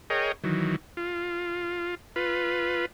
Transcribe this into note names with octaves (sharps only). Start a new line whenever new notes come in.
G#4 A#4 C#5 D#5 G5
D#3 E3 F#3
F4
F4 B4